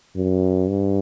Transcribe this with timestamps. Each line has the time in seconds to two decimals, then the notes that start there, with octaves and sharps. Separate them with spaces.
0.16 F#2
0.69 G2